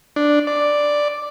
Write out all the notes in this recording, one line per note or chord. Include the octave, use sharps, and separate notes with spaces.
D4
D5